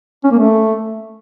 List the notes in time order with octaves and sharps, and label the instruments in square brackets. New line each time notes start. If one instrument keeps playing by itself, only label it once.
[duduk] C#4
A#3
A3